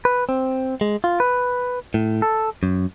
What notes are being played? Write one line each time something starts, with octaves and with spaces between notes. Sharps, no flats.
B4
C4
G#3
F4
B4
A2
A4
F#2